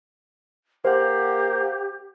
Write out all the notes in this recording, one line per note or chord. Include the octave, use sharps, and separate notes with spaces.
A#3 G4 C5 F5 F#5